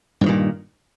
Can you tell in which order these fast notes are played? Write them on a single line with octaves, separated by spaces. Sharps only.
G2 F3 D#3 A#2